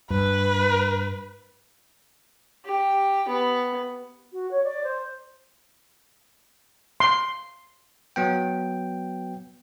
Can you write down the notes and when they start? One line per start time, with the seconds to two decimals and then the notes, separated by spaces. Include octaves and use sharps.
0.10 G2 B4
2.65 G4
3.28 B3
4.32 F#4
4.51 C#5
4.64 D5
4.83 C5
7.00 C6
8.16 F#3 B3 G5